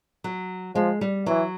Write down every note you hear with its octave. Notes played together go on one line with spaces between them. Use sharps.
F#3
F3 G#3
G3
E3 F#3